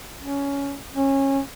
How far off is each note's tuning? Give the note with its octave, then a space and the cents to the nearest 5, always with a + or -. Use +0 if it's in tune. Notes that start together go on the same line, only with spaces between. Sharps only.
C#4 +15
C#4 -20